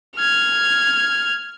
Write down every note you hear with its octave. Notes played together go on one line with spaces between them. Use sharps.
F6 G#6